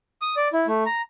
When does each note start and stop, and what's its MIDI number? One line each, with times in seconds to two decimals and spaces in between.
0.22 0.35 87
0.37 0.48 74
0.53 0.67 64
0.67 0.84 57
0.86 1.02 82